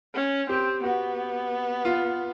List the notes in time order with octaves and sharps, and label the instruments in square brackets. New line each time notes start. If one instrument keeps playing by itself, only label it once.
[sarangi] C#4
[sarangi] C4 [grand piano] G4
[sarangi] B3 [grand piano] F#4
[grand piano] F4